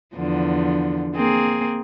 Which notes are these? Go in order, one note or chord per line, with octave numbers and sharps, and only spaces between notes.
E2 D3 F3
A#3 C4 G#4